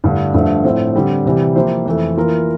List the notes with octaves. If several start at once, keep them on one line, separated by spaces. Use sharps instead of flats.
G2 D3 A3 E4
G2 D3 F3 A3
A2 F3 A3 C4
D3 G3 C4
C3 E3 G3
F3 A#3 E4 G4 C5
F2 E3 A3
E3 A#3 F4 A#4